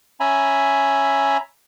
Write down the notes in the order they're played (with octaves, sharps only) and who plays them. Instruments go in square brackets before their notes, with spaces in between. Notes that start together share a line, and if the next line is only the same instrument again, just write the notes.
[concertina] C#4 E5 G#5 A#5 B5